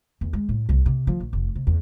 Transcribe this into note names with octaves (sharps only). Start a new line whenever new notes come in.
E2
G#3
A2
C2
C3
F3
A#1
F1
C3
E2